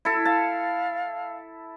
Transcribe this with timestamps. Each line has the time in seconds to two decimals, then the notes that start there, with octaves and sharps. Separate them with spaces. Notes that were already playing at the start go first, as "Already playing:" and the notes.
0.05 E4 A4
0.25 F5 A5